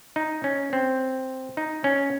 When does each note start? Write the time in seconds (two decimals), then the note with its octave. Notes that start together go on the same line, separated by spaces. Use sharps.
0.16 D#4
0.44 C#4
0.73 C4
1.57 D#4
1.84 C#4